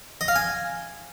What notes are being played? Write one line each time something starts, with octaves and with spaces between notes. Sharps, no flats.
D#5
F5
G#5